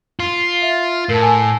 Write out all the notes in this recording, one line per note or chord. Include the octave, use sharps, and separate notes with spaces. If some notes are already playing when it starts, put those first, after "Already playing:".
F4
E5
A2 A#4 A5
G#5 A5 E6